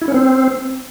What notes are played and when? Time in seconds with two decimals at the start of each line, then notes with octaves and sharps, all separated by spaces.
0.02 E4
0.08 C#4
0.14 C4